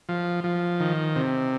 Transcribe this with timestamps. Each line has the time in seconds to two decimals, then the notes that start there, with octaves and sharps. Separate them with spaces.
0.09 F3
0.44 F3
0.80 D#3
1.16 C3